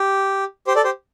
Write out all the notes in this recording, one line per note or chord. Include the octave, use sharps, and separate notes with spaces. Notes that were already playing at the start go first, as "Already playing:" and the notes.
Already playing: G4
G4 C5
A4 D5
G4 C5